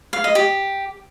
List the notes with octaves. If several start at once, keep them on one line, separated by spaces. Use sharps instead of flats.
F5
D#5
G4